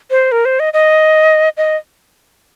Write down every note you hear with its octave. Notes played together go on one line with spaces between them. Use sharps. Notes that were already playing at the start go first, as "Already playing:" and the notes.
C5
A#4
C5
D#5
D#5
D#5